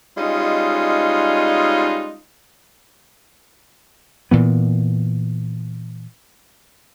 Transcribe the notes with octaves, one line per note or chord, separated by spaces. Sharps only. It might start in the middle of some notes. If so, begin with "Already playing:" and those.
G3 G#3 C#4 D#4 F4
A#2 E3 B3